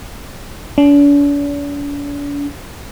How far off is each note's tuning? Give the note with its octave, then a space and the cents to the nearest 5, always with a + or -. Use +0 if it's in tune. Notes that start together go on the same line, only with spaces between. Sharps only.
D4 -45